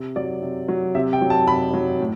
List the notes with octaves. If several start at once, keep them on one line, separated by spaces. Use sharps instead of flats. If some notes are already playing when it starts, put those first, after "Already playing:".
Already playing: C3
F#3 D5
C3
F#3
C3 E5
G5
F#3
A5
C3 B5
F#3
A2